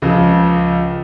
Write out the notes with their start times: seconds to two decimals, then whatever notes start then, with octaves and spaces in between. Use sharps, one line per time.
0.02 C#2 C#3 F3